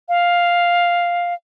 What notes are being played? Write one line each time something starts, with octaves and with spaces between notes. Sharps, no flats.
F5